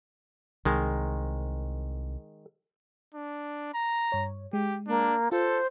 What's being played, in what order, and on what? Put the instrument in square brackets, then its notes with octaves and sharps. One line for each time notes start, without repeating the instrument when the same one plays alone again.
[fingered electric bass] C2 [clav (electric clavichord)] D#3 G#3
[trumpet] D4
A#5
[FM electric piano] G2 C#5
[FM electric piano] G#3 [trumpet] G4
[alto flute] A#3 [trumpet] D4
[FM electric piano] F4 [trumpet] A4 [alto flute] C5